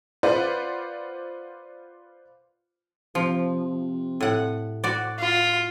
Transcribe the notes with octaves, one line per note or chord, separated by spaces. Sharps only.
F4 B4 C5 D5 F#5
C3 F3
A2 F#5
F#4 D5
F4